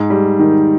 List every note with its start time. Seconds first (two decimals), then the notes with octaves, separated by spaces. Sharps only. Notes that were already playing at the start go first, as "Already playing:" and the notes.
Already playing: G#2
0.10 G3
0.39 D#3